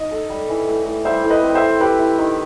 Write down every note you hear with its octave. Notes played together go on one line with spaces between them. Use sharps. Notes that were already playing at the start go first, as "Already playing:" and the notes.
Already playing: D#4 D#5
A4
G3
E3
A2
A2
G3 C5 E5
A2
B4 D#5
C4
C5 E5
C4
E4 G4 B4
E4
D#3